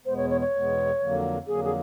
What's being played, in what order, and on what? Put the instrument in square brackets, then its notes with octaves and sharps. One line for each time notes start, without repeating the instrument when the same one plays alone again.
[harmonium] E2 B2 G#3 B3 [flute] C5
[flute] C#5
C#5
C#5
[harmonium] E2 B2 G#3 B3
F2 D3 F#3 A#3
[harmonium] F2 D3 F#3 A#3 [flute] G#4
[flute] G#4